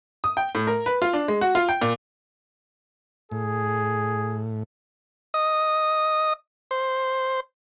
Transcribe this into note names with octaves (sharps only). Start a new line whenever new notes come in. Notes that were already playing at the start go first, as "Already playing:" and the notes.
D#6
G5
A2
A#4
B4
F4
D4
G#3
F#4
F4
G5
A#2
A2 G#4
D#5
C5